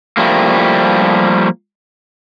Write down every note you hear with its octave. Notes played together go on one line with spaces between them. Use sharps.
F3 G3 A3 A#3